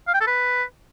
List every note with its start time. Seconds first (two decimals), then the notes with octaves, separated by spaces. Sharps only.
0.08 F5
0.14 G5
0.21 A4
0.27 B4